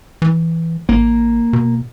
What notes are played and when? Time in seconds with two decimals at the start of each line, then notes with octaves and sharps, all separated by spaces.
0.22 E3
0.89 A1 A#3
1.53 B2